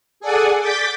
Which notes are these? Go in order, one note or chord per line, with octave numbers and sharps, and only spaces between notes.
G#4 A4 D5 F#5 G#5
D6 G6 A6 B6